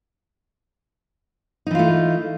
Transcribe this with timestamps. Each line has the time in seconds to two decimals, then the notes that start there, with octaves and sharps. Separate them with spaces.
1.67 D#4
1.71 E3
1.75 F4
1.79 A3